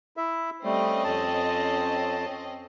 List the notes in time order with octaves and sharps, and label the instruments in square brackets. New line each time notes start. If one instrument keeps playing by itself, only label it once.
[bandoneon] E4 E5
[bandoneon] G3 A3 [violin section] C4 C#4 D#5
[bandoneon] F2 A5